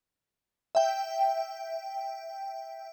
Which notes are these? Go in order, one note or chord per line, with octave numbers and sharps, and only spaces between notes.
E5 G5